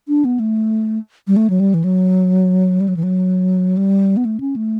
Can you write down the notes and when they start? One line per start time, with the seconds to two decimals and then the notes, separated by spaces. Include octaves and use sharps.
0.08 D4
0.25 B3
0.40 A3
1.27 G3
1.36 A3
1.50 F#3
1.60 G3
1.74 E3
1.84 F#3
2.81 G3
2.88 F#3
2.97 E3
3.03 F#3
3.77 G3
4.17 B3
4.25 A3
4.40 C#4
4.56 A3